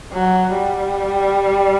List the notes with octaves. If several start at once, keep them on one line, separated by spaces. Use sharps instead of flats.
F#3
G3